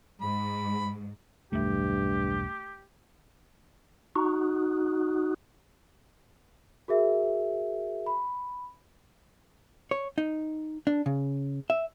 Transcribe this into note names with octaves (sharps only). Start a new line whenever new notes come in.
G#2 B5
B1 E2 G2 D3 A3 G4 E5
D#4 F#4
F#4 G#4 A#4 E5
B5
C#5
D#4
D4
C#3
E5